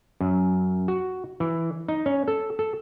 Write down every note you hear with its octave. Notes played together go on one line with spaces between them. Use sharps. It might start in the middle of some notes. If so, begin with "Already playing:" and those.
F#2
F#4
E3
D#4
C#4
A4
A4